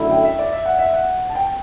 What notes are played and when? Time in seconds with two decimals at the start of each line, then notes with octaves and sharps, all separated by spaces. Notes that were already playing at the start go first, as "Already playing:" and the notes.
Already playing: F#2 D3 A3 E4
0.11 G5
0.25 E5
0.39 D5
0.53 E5
0.66 F#5
0.79 E5
0.93 F#5
1.29 A5
1.35 G5